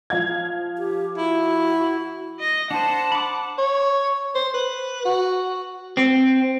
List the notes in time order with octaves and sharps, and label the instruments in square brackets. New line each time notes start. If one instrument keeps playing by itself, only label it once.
[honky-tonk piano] F3 F5 G#6
[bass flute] G4
[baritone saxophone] E4 [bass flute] F#4
[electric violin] D#5 A#6
[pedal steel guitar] D4 C5 [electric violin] F#5 [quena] A5
[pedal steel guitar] B5 D6
[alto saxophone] C#5
C5
B4
F#4
[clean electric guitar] C4